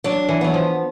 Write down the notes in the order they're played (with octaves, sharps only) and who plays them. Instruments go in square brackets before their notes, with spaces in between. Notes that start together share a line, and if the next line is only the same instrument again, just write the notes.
[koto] F#3 [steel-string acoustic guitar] D4
[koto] E3
[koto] F#3 [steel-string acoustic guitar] B3
[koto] F3